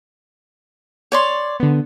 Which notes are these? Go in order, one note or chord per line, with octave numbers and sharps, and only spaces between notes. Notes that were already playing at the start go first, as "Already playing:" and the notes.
C#5 D5 C6
D3 B3